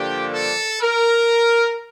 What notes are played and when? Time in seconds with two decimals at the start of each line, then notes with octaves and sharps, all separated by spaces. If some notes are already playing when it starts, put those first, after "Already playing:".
Already playing: G2 D3 F3 A#3 D4 G4
0.32 A4
0.82 A#4